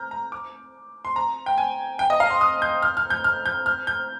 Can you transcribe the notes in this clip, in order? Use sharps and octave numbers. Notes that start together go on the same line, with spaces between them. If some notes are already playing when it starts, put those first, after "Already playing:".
Already playing: A#5 F6 G6
A#5
D6
C6
A#5
G5
G#5
G5
D#5
F5
C6
D#6
G6
F6
F6
G6
F6
G6
F6
G6